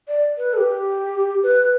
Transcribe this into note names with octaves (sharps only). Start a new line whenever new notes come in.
D5
B4
A4
G4
B4